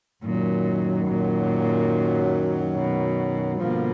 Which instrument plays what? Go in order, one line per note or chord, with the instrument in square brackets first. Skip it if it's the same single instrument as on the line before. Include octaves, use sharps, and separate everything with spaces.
[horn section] F#2 D#3 F#3 [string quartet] A#2
[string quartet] A#2
B2
[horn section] G2 D3 F3 A#3 [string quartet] B2